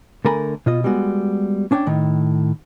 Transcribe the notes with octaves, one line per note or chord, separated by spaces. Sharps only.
D3 A3 A4 A#4 G#5 B5
B2 F4 D#5
G3 G#3 B3 F#4
C#4 D4 C#5 F#5 G5
A2 D#3